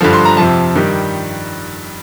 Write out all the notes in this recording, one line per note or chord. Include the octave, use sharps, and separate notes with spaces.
G2 D3 F3
C6
A#5
F2 C3 F3 A5
G2 D#3 G3